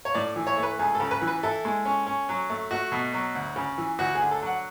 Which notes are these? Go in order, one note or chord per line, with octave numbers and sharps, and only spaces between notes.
C#5
A2 D5
E3
C#5
A3
B4
C#2 G#4
C#3 A4
B4
E3
B4
E4 A4
G#3
C#4
C#4
F#3
A3
A3 F#4
B2
F#3
D2
C#3
E3
D2 F#4
G#4
D3
A4
F#3 F#5